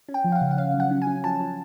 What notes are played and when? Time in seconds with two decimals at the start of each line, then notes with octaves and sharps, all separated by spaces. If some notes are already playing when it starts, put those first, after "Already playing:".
0.08 C#4
0.14 G5
0.24 F3
0.32 F5
0.36 F#5
0.41 C#3
0.51 F#5
0.57 C#4 F5
0.74 F#3
0.80 F#5
0.91 C#4
1.02 G#5
1.07 C#4
1.24 F3 A5
1.40 F3